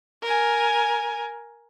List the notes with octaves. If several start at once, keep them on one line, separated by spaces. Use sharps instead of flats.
A#4 G#5